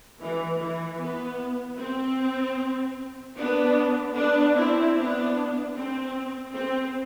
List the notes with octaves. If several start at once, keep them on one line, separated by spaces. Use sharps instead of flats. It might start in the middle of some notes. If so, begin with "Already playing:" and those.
E3
E3
B3
C4
B3 D4
B3 D4
C4 E4
B3 D4
C4
C4